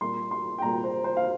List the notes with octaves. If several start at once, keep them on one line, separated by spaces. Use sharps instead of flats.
A#2 G3 A#3 C6
C6
G5
A#2 G3 A#3 A#5
C5
C5
F5